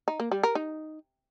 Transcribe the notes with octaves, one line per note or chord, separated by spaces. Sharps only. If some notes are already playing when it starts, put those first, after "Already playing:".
D#4
A#3
G3
A#4
D#4